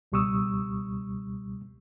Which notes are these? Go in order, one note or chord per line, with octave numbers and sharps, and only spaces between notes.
C#2 B2 G3 C#6 D#6 E6